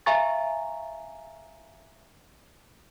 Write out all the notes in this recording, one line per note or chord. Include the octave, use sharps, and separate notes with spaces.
E5 F5 G#5 A#5 C#6 A6